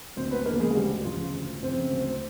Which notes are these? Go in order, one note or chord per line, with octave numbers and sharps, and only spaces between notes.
D2 C4 C5
B3 B4
C#3 F3 A#3 A#4
G#3 G#4
F#4
D2 G3 G4
C#3 F3 F4
D2
C#3 F3 C4 C5
D2